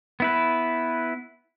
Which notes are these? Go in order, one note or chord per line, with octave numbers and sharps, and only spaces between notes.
B3 E4 B4